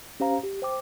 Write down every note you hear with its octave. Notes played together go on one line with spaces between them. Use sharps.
C#4 G4 C5 F5 A#5
G4
C5 G5 D6